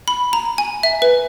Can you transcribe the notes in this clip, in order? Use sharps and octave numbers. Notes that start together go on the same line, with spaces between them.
B5
A#5
G#5
E5
B4